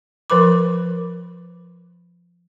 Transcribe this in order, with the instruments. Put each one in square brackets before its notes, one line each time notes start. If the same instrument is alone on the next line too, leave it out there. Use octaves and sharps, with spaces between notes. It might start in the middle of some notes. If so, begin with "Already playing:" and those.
[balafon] F3 A#4 B4 B5 D6